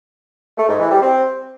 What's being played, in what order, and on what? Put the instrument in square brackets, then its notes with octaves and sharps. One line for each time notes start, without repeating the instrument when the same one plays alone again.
[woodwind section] A3
G#2
E3
G3
C4